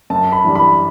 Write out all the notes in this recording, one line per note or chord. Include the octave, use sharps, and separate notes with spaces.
F#2 A5
B5
E3 G3 D4
B5